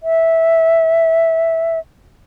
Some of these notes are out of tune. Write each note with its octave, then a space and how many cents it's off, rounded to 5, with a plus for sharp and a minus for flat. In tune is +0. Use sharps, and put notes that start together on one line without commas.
E5 -10